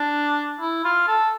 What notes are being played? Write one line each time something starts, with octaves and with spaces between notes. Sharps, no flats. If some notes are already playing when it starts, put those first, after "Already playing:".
Already playing: D4
E4
F4
A4